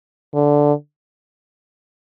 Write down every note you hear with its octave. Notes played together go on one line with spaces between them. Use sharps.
D3